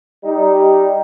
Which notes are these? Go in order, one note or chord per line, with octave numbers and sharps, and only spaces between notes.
G3 D#4